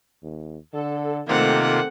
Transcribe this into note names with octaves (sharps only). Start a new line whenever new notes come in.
D#2
D3 A4
C3 D#3 A3 A#3 C4 F4 A4 F#5